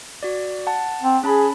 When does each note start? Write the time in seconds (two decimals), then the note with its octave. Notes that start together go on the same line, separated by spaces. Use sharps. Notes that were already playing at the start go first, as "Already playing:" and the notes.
0.23 F#4 D5
0.67 F#5 A5
1.02 C4
1.23 C#4 G#4 A5 B5